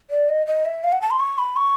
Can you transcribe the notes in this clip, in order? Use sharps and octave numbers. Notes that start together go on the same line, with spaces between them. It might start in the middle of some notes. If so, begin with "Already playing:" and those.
D5
D#5
D#5
E5
F5
F#5
A5
C6
C#6
B5
C#6